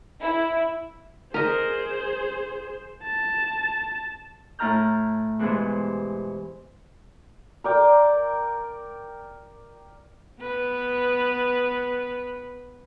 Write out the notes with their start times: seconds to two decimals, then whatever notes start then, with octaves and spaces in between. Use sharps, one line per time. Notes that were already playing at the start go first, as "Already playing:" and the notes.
0.21 E4
1.34 G#4 A#4 C5 D#5
3.03 A5
4.59 A2 E4 A5 A#5 F6 G6
5.39 G2 B2 E3 G#3 B3 C5
7.64 A#4 D5 G5
10.41 B3 B4